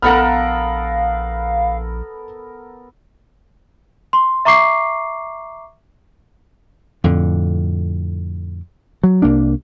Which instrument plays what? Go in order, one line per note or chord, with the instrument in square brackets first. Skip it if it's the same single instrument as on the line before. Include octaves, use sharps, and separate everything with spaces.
[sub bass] A#1 [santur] B3 A4 A#4 [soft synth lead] F5 [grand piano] F#5 B5 F6
[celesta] C6
E5 A#5 C#6 D6 C7
[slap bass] F2 A2 D3
F#3
C2 A#3 D4